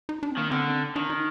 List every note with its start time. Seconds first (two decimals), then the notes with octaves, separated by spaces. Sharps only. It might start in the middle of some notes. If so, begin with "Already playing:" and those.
0.09 D#4
0.23 D4
0.32 C4
0.37 D#3 A#3
0.51 D3 C4
0.96 D#3 D4
1.10 D#4